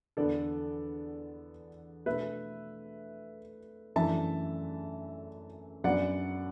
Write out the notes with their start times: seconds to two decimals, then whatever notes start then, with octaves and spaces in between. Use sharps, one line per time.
0.17 E2 D3 B3 D4 A4 D5
2.06 B2 A3 D4 B4 E5
3.96 F#2 E3 A3 D4 E5 A5
5.84 F#2 F#3 B3 D4 D5 F#5